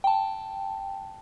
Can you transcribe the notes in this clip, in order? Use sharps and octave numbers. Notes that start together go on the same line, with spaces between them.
G5 A5